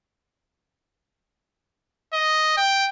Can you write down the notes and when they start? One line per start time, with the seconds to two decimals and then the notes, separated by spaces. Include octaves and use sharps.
2.14 D#5
2.57 G5